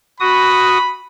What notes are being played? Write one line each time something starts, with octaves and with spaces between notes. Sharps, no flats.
F#4 B5 D#6